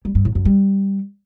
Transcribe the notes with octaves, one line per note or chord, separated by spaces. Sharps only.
G3
G2
A2
F#2
G3